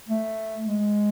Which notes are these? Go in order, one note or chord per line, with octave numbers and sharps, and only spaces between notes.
A3
G#3